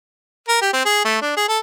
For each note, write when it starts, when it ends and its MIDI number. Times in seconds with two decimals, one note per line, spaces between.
0.48 0.59 70
0.62 0.72 67
0.73 0.85 60
0.85 1.03 68
1.05 1.19 57
1.21 1.34 62
1.37 1.44 68
1.48 1.59 69